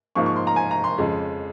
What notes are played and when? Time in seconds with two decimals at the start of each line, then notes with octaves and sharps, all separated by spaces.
0.15 G#2 F3 A#3 C#6
0.26 C#6
0.36 C6
0.47 A#5
0.56 G#5
0.71 A#5
0.84 C6
0.98 F2 C#3 G#3